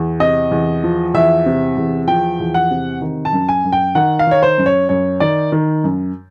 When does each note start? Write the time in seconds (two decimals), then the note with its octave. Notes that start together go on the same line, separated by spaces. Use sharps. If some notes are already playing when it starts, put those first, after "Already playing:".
Already playing: E2
0.20 C3 D#5
0.51 E2
0.84 F3
1.14 E2 E5
1.46 C3
1.77 E2
2.08 F3 G5
2.40 E2
2.54 F#5
2.71 C3
3.02 D#3
3.25 A5
3.33 F#2
3.49 G#5
3.64 F#2
3.72 G5
3.95 D#3 F#5
4.19 F5
4.27 D#3 C#5
4.43 C5
4.58 F#2
4.66 C#5
4.89 F#2 C#5
5.20 D#3 D5
5.52 D#3
5.84 F#2